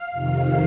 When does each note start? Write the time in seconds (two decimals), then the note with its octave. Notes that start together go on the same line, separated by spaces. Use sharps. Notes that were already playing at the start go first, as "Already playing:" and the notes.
Already playing: F5
0.11 F2 C3 D#3